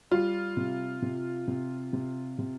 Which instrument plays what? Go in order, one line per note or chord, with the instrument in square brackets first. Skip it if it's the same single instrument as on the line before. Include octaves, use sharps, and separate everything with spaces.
[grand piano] G3 [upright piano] F4
[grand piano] C3
C3
C3
C3
C3